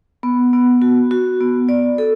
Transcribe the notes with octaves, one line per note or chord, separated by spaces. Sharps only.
B3
B3
F#4
F#4
B3
D5
A4